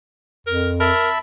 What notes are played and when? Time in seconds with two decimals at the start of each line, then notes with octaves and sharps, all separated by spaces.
0.47 F2 A#4
0.80 A#4 E5 A5 B5